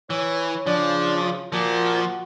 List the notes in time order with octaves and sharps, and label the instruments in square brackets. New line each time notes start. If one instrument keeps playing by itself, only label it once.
[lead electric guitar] E3 [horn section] C#5
[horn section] C#3 [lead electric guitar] F3 [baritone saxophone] D4
[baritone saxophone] A#2 [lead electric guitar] F3 [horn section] F#4